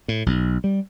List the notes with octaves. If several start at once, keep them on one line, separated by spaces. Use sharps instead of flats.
A2
B1
G3